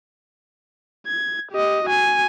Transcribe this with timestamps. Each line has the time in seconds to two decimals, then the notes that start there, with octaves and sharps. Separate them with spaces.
1.07 G#6
1.52 G4 D#5
1.84 F#4 G#5